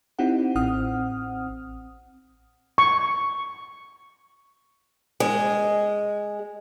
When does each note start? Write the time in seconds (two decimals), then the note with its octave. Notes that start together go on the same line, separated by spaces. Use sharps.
0.19 C4 D#4 E4 G4 F#5
0.56 A1 C4 F#5 D#6 F6
2.78 C#6
5.20 G#3